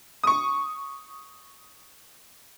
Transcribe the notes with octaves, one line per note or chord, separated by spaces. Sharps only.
C#6 D#6